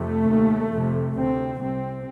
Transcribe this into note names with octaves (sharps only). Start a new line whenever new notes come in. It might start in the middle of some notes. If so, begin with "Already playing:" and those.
Already playing: F2 C3 A3
D#2
F2 C3
D2 C3 C4
C2 C3 C4